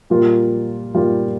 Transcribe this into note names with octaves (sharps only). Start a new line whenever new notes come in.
A#2 G3 A#3 F4
A#2 G3 A#3 F4